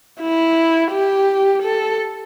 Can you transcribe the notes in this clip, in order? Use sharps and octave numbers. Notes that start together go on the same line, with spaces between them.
E4
G4
A4